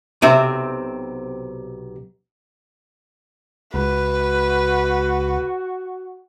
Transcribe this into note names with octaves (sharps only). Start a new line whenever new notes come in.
B1 C3 C4 E5
C#2 F#4 B4